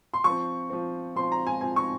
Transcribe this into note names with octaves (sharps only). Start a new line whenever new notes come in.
C6
F3 C#6
C4
F3 C4
F3 C4 C6
A#5
G#5
F3 C4 G#5
C#6